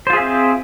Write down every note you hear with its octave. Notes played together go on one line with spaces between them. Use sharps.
C4 F4 G#4 C5 E5